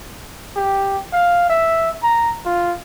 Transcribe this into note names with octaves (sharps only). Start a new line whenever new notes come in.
G4
F5
E5
A#5
F4